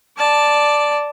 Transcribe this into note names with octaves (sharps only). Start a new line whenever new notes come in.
D5 A5